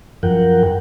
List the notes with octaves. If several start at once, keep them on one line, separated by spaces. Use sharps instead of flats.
F#2 F3 A#4 F#5 G5